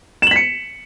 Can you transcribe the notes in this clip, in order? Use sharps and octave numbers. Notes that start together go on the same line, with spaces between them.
B6 C#7 E7 F#7